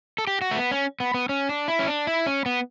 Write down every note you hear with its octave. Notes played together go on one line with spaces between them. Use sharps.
A4
G4
F#4
A3
B3
C#4
B3
B3
C#4
D4
E4
C#4
D4
E4
C#4
B3